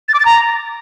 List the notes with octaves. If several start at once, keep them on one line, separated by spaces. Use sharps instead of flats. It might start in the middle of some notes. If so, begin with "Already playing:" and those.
A6
D6
A6
A#5